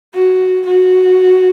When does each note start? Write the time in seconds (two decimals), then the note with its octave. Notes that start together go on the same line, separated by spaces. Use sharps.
0.14 F#4
0.66 F#4